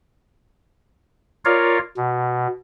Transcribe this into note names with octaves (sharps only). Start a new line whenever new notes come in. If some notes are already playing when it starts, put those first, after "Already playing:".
F4 A#4 C#5 D5 F5
B2